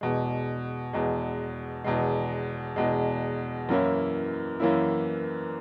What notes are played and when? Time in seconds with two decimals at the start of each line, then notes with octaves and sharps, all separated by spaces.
0.01 E2 B2 G#3
0.93 E2 B2 G#3
1.84 E2 B2 G#3
2.76 E2 B2 G#3
3.69 F#2 E3 A#3 C#4 E4
4.60 F#2 E3 A#3 C#4 E4